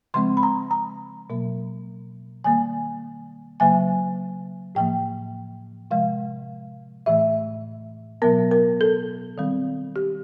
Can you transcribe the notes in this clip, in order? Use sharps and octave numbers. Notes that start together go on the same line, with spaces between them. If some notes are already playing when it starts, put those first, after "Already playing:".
C#3 F3 G#3 C4 C6
B5
A#5
A#5
B2 F#3 A#3
D#3 G3 A#3 G#5
C#3 F#3 A#3 G#5
A2 F3 A#3 G5
C3 F3 G#3 F5
A2 E3 A3 E5
B2 F#3 B3 A#4
A#4
A4
D#3 G3 C4
G4